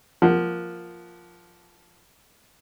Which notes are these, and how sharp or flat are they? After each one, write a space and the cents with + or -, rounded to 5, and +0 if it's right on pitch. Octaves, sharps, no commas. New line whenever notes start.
F3 +0 A#3 +0 F#5 +0